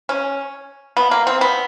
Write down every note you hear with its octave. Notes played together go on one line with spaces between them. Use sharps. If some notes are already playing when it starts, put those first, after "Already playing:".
C#4
B3
A#3
C4
B3